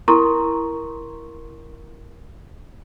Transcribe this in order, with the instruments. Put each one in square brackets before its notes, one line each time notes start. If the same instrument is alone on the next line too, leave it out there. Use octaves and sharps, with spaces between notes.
[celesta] E4 A#4 A#5 C6 C#6